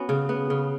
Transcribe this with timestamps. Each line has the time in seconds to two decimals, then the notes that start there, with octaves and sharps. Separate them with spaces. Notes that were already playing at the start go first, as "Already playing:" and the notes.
Already playing: B3 C#4 F#4
0.09 C#3
0.29 B3
0.50 C#3